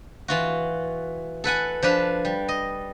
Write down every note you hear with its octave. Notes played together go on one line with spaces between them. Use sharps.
E3 F4 F#4
A4 B4 F#5 G#5
F3 D4 B4 F5
G3
D#5